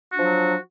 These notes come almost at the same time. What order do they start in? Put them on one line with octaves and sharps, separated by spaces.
F#4 D4 F3 F#3